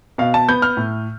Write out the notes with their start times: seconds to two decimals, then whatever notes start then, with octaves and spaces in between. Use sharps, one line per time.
0.18 B2 F5
0.34 A5
0.49 B3 G6
0.62 F6
0.77 A2